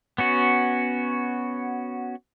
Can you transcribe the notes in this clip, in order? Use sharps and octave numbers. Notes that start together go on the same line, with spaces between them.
B3 C#4 F#4